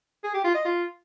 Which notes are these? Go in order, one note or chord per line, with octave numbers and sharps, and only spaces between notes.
G#4
G4
F4
D#5
F4